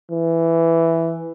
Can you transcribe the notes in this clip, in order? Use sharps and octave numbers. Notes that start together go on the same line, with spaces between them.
E3